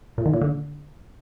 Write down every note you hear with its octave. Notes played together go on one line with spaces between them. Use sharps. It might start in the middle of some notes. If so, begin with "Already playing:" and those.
A#2
D#3
A#2
D3